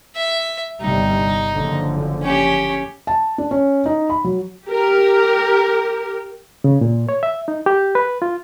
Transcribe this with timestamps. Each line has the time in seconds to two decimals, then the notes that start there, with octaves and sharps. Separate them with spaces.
0.15 E5
0.81 G1 C3 G3 D#4
1.53 F#1 D3 F3
2.22 C#4 G4
3.07 A5
3.38 D4
3.51 C#4
3.86 D#4
4.10 B5
4.24 F#3
4.67 G4 A#4
6.64 C#3
6.81 A#2
7.09 C#5
7.23 E5
7.48 D#4
7.66 G4
7.95 B4
8.22 F4